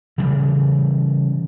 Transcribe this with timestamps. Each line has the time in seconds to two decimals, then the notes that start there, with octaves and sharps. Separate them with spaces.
0.18 C#3 E3 G3